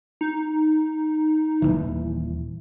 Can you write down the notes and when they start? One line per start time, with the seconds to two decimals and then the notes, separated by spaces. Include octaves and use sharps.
0.21 D#4
1.62 D#1 C2 E3